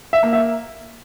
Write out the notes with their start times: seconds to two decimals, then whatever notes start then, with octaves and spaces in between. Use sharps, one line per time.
0.13 E5
0.23 A#3
0.33 E5